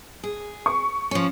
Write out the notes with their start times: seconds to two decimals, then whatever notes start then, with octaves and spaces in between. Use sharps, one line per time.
0.24 G#4
0.66 C#6
1.11 F3 C#4